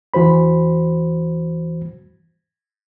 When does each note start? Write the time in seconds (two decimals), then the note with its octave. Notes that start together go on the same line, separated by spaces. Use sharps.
0.14 E2 E3 F#4 C5 B5